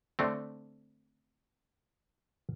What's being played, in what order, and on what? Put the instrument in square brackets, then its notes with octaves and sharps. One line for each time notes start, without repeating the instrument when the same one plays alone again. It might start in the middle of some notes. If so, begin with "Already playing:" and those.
[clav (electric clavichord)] D3 A3 C4